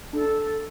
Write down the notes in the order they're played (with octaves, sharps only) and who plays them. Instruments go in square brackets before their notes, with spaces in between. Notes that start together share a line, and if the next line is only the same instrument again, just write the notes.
[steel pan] D4 [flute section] A4